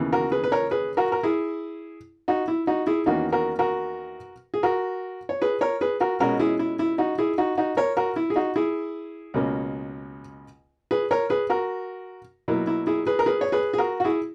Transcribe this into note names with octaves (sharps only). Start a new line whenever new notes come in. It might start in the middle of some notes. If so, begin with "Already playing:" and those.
Already playing: D#2 C#3 E3 B3
F#4 A#4
G#4 B4
B4
A#4 C#5
G#4 B4
F#4 A#4
A#4
E4 G#4
D#4 F#4
E4
D#4 F#4
E4 G#4
E2 D#3 A#3 C#4 D#4 F#4
F#4 A#4
F#4 A#4
G#4
F#4 A#4
C#5
G#4 B4
A#4 C#5
G#4 B4
F#4 A#4
B2 G#3 C#4 F#4 A#4
E4 G#4
E4
E4
D#4 F#4
E4 G#4
D#4 F#4
D#4 F#4
A#4 C#5
F#4 A#4
E4
G#4
D#4 F#4
E4 G#4
C#2 B2 A#3 C#4
G#4 B4
A#4 C#5
G#4 B4
F#4 A#4
B2 F#3 A#3 E4
E4
E4 G#4
G#4 B4
A#4
G#4 B4
C#5
G#4 B4
G#4
F#4 A#4
F#4
E4 G#4